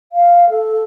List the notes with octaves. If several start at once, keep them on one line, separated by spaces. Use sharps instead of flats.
F5
A4